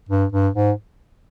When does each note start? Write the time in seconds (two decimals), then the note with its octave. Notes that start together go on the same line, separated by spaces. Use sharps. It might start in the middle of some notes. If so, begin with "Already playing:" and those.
0.09 G2
0.32 G2
0.55 G#2